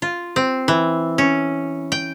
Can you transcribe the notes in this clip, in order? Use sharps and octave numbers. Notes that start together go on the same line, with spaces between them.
F4
C4
E3
C#4
G5